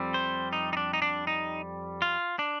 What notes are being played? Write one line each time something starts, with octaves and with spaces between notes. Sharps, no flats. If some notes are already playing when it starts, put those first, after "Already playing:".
Already playing: F2 G3 C4
C5
D#4
D#4
D4
D#4
D4
D#4
F4
D4